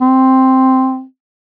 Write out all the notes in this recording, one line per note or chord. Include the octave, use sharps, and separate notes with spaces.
C4